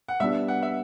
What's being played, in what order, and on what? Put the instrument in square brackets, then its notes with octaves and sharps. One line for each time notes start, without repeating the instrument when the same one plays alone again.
[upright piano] F#5
[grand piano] G3 B3 D4 G4 [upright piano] E5
[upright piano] F#5
E5